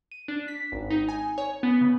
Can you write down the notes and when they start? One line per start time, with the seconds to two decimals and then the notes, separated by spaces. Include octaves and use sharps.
0.12 D#7
0.28 D4
0.48 B6
0.72 G#1
0.91 D#4
1.09 G#5
1.38 C#5
1.63 B3
1.81 C#3